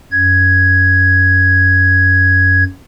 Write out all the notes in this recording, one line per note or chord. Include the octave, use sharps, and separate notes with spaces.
F#2 G#6